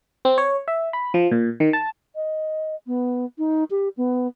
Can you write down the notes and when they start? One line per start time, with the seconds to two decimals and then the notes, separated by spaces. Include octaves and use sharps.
0.25 C4
0.38 C#5
0.68 E5
0.93 B5
1.14 F3
1.31 A#2
1.60 D#3
1.73 A5
2.15 D#5
2.87 B3
3.38 D#4
3.70 G4
3.97 B3